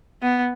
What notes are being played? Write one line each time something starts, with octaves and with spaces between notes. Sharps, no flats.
B3